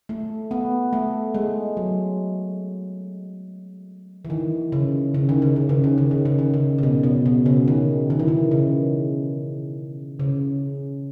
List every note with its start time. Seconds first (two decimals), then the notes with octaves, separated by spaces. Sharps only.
0.09 A3
0.51 B3
0.93 A3
1.35 G#3
1.77 F#3
4.25 E3
4.30 D#3
4.72 C#3
5.14 C#3
5.29 D#3
5.42 C#3
5.56 D#3
5.69 C#3
5.84 D#3
5.98 C#3
6.11 D#3
6.25 C#3
6.39 D#3
6.54 C#3
6.78 C#3
6.83 B2
7.03 B2
7.26 B2
7.46 C#3
7.68 D#3
8.10 D#3
8.20 E3
8.28 D#3
8.51 C#3
10.20 C#3